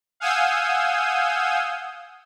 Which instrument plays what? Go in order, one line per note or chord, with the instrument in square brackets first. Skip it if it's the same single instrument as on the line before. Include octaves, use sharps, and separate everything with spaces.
[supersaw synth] F5 F#5 G#5 D#6 E6 G6